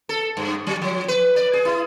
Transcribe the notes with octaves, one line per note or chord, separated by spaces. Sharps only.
A4
G2
F#3
F3
B4
D5
G#4
E4